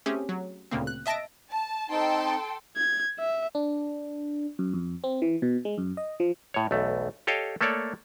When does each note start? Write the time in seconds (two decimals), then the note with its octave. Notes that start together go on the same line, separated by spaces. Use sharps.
0.06 A3 C4 C#4 G4 G#4
0.29 F#3
0.71 D2 A#2 C#3 A#3 C4
0.87 F#6
1.06 D#5 E5 A5 A#6 D7
1.50 A5
1.90 C4 D#4 A4 G5 A5 C6
2.76 G#6
3.19 E5
3.55 D4
4.59 F#2
4.73 F2
5.04 C4
5.22 E3
5.42 B2
5.65 G#3
5.78 F#2
5.97 D#5
6.20 F3
6.54 A2 C#5
6.71 B1 E2 A3
7.27 G4 A4 C#5 D#5 F5 G5
7.61 A3 A#3 A4 C#5 D5